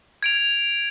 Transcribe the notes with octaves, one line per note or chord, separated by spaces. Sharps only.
G#6 D7 F7